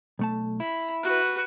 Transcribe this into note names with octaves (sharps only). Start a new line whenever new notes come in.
B1 A3 A5
E4 B5
F#4 B4